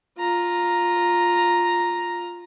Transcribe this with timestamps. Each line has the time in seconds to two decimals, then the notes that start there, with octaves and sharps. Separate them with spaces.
0.19 F4 A#5